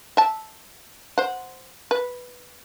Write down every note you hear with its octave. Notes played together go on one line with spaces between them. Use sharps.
E5 A5
C5 F#5
B4